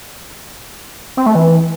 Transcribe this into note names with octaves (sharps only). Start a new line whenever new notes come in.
C4
A3
E3